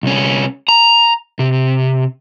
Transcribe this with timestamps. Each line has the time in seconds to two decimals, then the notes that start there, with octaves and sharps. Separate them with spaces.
0.03 C2 C#4
0.68 A#5
1.39 C3